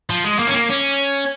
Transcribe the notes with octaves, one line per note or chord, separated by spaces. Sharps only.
F3
G#3
A#3
C#4
A#3
C#4